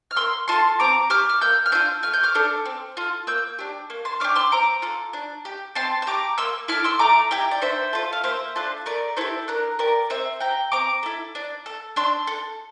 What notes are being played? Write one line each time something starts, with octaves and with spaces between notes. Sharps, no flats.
F6
A#3 C6 E6
F4 A4 A5 C6
C4 A#5 D6
G4 D6 F6
F6
A#3 E6 G6
F6
D4 F4 E6 G6
A3 F6
G6
D6 F6
D4 A4
C4
F4 A4
A#3 E6 G6
D4 G4
A#3
A5 C6
D4 G4 D6 F6
C6 E6
C4 A#5 D6
F4 A4
D4
G4
C4 A5 C6
E6
G4 A#5 D6
A#3 C6 E6
E4 A4 D6 F6
C6 E6
A3 A#5 D6
E4 G4 G5 A#5
D5
D4 C5 E5
F4 A4
F5
A#3 C5 E5
D4 F4 A4
A3 A#4 D5
E4 G4 A4 C5
D4 A#4
G4 A#4 D5
C4 C5 E5
G4 G5 A#5
C4 A#5 D6
E4 A4
D4
A4
D4 C6 E6
A4